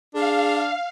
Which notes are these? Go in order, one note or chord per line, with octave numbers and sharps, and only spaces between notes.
D4 G#4 F5